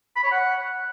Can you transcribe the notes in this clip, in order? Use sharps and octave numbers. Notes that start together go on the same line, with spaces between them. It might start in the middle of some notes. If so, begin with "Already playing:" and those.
B5
C#5
F#5